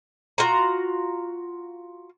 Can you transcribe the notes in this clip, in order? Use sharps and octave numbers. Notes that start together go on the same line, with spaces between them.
F4 F#4 A#5